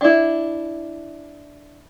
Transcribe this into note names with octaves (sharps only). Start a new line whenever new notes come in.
D4 E4